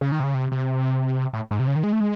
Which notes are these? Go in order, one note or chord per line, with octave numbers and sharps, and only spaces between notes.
C#3
D#3
C3
C#3
C3
C3
A2
G#2
C3
C#3
D#3
G#3
A3
G#3